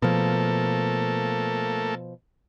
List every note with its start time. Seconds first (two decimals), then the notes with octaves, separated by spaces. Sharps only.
0.02 B2 F3 A3 A#3 A4